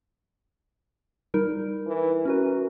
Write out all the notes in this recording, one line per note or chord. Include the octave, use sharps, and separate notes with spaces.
G3 D#4 A#4
E3
C#4 F#4 A#4 B4